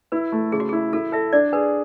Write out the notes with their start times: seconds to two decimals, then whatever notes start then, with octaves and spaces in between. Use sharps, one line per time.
0.12 E4 B4
0.32 A3
0.52 C#3 G#4
0.60 F#4
0.69 G#4
0.73 E4
0.93 E4 A4
1.12 A4 E5
1.33 D4 D5
1.53 G#4 B4